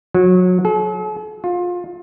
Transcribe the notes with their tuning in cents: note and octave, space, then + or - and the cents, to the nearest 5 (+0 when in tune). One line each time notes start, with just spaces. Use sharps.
F#3 -25
A4 -45
F4 +25